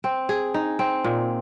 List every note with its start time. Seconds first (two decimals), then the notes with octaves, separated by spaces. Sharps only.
0.04 C4
0.29 G#4
0.54 D#4
0.79 C4
1.04 A#2